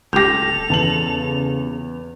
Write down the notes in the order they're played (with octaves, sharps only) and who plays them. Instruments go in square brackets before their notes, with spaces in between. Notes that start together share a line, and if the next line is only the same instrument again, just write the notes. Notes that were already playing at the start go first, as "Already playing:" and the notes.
[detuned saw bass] D1 [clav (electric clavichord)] C#2 G4 [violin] A4 F7 [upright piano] G6 A#6
[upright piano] E2 A5 F#7 [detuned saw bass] C#3